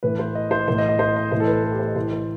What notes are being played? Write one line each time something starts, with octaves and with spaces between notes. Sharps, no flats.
A2 E3 B4
C5
D#5
C5
A2 E3 C5
D#5
D#5
C5
D#5
A2 E3 C5
A4
B4
A4
G4
C5
D#5
A2 E3 C5
C5